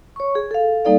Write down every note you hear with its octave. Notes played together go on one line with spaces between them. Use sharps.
C#5 C#6
G#4
A4 F5
G3 A#3 D#4 A4 D5 F5